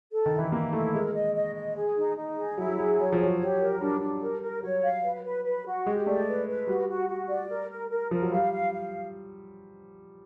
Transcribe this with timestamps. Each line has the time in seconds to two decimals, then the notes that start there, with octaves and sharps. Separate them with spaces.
0.12 A4
0.26 D#3
0.33 E4
0.39 E3
0.52 A#3 E4
0.73 A3 E4
0.94 G#3 A#4
1.14 D#5
1.35 D#5
1.55 D#5
1.76 G#4
1.97 D#4
2.17 D#4
2.37 G#4
2.57 F#3 E4
2.67 F#3
2.78 F#3 G#4
2.99 F#3 C#5
3.12 F3
3.19 C#5
3.26 F#3
3.40 G4
3.60 A#4
3.81 G3 D4
4.01 D4
4.21 A#4
4.42 A#4
4.63 F#3 C#5
4.83 F5
5.04 B4
5.24 B4
5.45 B4
5.66 F#4
5.86 G#3 G4
6.06 A3 D5
6.27 B4
6.48 B4
6.67 G3 F#4
6.88 F#4
7.09 F#4
7.29 D5
7.50 A#4
7.70 A#4
7.90 A#4
8.11 F3 A#4
8.22 F#3
8.32 G3 F5
8.53 F5
8.73 F5